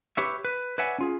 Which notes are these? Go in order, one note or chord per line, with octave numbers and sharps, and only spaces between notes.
G4 B4 C#5 E5
B4
B4 C#5 D5 E5 F#5 G#5
C#4 F4 G#4